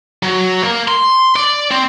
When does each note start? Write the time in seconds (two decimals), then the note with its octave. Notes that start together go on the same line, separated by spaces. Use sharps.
0.23 F#3
0.64 A#3
0.88 C6
1.36 D5
1.71 C4